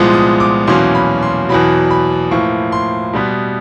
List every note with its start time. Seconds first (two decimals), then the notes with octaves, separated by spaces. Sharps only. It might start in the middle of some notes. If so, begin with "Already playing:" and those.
Already playing: C2 A#2 F3 G#3 B3
0.14 D#6
0.40 D6
0.67 E2 B2 F#3 A#3 C#4 C6
0.95 B5
1.23 C6
1.49 E2 B2 F#3 B5
1.91 B5
2.31 A2 F3 A#3 C#6
2.72 C6
3.13 B2 G3 B3